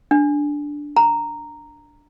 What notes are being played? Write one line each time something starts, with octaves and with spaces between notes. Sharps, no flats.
D4
A#5